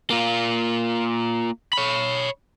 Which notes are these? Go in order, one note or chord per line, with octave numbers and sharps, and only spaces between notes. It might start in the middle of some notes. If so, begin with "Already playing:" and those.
A#3 F4
C#5 B5